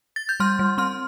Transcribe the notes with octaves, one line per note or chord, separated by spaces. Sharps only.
A6
G6
G3 C6 F6
G3
C4 C6 F6